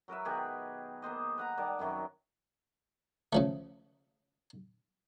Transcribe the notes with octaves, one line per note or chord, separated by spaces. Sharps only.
F#3 A#4 B4 E5
B2 D#3 G4 G#4
A#3 B3 C5 D#5
B4 F#5 A#5
D#3 G3 D5 A5
F#2 C3 D#3 F#3
C#3 F3 A3